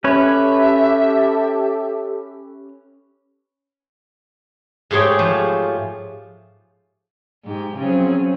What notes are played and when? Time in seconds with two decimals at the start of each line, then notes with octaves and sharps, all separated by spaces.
0.04 C#4 G4 A4 B4 C#5 E5
4.91 G#2 A3 G4 G#4 C#5 G5
5.19 F3
7.45 G#2 G4
7.77 C#3 F3 F#3 C4 C#4 G#4